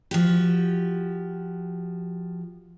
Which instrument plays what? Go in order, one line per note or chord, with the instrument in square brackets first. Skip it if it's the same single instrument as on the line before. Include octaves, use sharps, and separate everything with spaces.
[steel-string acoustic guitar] F3 F#4 G4